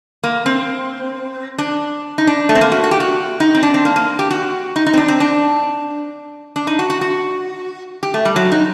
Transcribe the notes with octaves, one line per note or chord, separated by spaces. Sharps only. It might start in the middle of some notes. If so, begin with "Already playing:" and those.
A#3
C4
D4
D#4
D4
A3
C4
A#3
F#4
F#4
G4
F#4
D#4
C4
D4
C4
A#3
A#3
G4
F#4
D#4
D#4
C4
D4
C4
D4
D4
D#4
F#4
F#4
F#4
G4
A3
G3
F#3
D#4